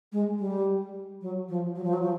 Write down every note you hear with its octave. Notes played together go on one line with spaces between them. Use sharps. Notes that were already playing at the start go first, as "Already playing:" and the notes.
G#3
G3
F#3
F3
F#3
F3
F#3
F3